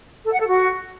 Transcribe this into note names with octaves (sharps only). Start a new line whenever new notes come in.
A4
F#5
A4
F#4